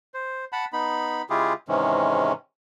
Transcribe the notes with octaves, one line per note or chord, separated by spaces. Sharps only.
C5
F#5 A5 B5
B3 D#4 B5
C#3 G#3 E4 F4 G4 G#4
G#2 C3 D#3 E3 G#3 C#4